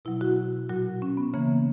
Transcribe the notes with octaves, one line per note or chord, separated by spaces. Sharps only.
B2 F#3 E4
F#4
A#2 F#3 F#4
C#4
B3
C#3 E3 A#3